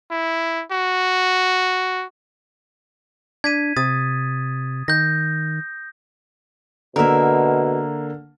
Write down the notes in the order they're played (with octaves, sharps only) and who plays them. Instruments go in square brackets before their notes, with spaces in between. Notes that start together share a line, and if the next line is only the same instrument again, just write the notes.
[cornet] E4
F#4
[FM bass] D4 [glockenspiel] G#6 B6 D#7
[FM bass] C3 [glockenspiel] D#6 A6
[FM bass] D#3 [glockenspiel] G6 A#6
[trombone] B2 [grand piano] D3 A#3 [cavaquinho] A#4 E5